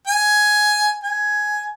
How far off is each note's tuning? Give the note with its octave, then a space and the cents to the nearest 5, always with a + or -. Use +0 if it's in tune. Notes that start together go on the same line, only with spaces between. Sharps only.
G#5 +10
G#5 +10